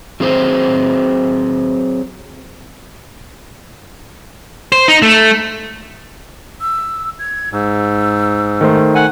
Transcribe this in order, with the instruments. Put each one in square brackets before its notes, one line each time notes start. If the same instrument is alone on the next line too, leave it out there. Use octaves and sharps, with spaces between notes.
[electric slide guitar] F#3 C4 G#4 C5
[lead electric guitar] C5
D#4
A3
[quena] E6
G#6
[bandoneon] G#2 [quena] E6
[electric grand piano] D#3 A3 C5
[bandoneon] F#5 G#5